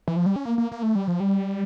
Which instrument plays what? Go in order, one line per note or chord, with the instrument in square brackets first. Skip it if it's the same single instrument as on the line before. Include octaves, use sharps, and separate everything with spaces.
[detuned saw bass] E3
F3
G3
C#4
A#3
A#3
A#3
A3
G3
F3
G3